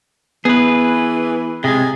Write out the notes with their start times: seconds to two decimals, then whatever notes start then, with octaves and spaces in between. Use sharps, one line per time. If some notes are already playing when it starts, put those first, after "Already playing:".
0.45 E3 B3 G#4 B4
1.64 C3 G#3 G#4